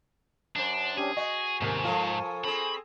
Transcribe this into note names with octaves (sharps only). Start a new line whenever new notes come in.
F#2 D4 C5
C#4 D4 G4 G#4
F#4 D#5 G#5 C#6
D#1 G#2 C3 A#4
F3 F4 A4 A#4
C4 G#4 B5